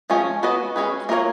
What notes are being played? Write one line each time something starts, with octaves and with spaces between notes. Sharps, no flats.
F3 G#3 C#4 G#4
B3 F#4 B4 D#5
G#3 C#4 G#4 B4
A#3 F4 A#4 C#5